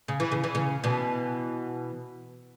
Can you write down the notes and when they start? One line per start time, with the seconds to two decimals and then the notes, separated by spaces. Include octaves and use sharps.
0.08 C#3
0.20 E3
0.32 C#3
0.44 E3
0.55 C#3
0.84 B2 E3